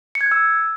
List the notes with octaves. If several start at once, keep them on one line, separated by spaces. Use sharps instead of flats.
C#7
G#6
F#6
E6